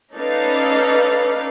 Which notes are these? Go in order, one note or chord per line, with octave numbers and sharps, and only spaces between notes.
C#4 D#4 A4 B4 D5 F5